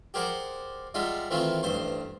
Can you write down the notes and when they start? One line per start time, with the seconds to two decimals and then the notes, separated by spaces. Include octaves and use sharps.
0.14 G4 G#4 A#4 C5 D5 F#5
0.94 G3 G#3 D#4 F4 E5 F#5
1.30 D#3 E3 A3 C4 D#4 F4
1.63 A1 G2 C5 C6